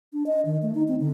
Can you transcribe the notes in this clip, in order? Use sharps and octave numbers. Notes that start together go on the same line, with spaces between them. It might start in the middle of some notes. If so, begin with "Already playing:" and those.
D4
D#5
D#3
A3
D#4
C4
D3